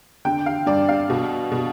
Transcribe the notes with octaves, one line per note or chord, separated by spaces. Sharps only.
D3 G5
F5
G2 D5
F5
B2
B2